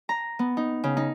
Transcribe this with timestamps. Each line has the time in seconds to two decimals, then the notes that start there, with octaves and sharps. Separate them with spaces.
0.09 A#5
0.39 B3
0.57 D#4
0.84 C#3
0.97 D#4